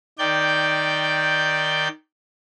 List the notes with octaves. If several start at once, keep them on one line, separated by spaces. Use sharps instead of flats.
D#3 D5 G5 G6